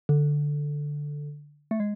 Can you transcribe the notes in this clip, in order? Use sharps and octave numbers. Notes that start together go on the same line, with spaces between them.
D3
A3
G#3